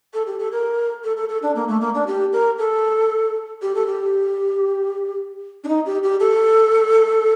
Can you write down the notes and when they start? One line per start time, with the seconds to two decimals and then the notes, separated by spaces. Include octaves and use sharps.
0.13 A4
0.26 G4
0.39 A4
0.51 A#4
1.03 A4
1.16 A4
1.28 A4
1.42 D4
1.55 A#3
1.68 A3
1.81 A#3
1.94 D4
2.06 G4
2.32 A#4
2.58 A4
3.62 G4
3.75 A4
3.86 G4
5.64 D4
5.68 D#4
5.85 G4
6.03 G4
6.19 A4